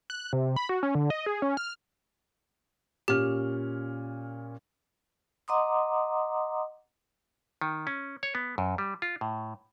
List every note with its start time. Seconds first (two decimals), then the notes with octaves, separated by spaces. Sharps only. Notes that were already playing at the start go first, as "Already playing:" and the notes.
0.10 F#6
0.33 C3
0.56 B5
0.69 F#4
0.83 C#4
0.95 D3
1.10 D#5
1.26 G#4
1.42 C#4
1.57 F6
3.08 A#2 C#4 G4 F6
5.48 D#5 F#5 A#5 C6 D6 D#6
7.61 D#3
7.87 C#4
8.23 C#5
8.35 B3
8.58 F#2
8.78 G3
9.02 F4
9.21 A2